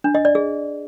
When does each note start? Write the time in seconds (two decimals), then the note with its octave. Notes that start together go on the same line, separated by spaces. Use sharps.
0.04 D4
0.15 D#5
0.25 D5
0.35 G#4